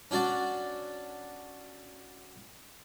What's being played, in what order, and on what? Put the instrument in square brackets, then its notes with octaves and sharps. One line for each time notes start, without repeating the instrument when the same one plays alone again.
[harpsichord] C#4 D4 F#4 D5